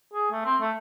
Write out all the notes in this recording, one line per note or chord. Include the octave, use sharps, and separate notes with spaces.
G#4
A3
C4
A3